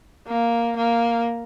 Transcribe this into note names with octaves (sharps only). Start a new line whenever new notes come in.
A#3
A#3